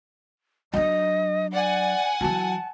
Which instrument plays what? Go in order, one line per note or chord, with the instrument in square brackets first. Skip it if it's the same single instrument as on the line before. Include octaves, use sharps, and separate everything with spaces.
[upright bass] F#3 D4 [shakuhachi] D#5
[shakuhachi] D5 [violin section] F#5 G#5
[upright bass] E3 F#3 [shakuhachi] A5